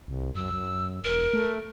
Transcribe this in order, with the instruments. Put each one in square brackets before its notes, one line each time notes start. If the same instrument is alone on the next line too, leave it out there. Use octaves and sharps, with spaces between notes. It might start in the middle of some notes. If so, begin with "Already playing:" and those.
[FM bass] C2
[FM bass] F#2 [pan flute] E6
[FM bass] F#2
[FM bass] E1 [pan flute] A#4
[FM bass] A3